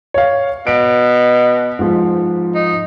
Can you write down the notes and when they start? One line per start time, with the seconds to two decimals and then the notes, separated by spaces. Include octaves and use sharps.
0.14 C#5 F5
0.67 B2 D7
1.79 G#2 F3
2.55 D#4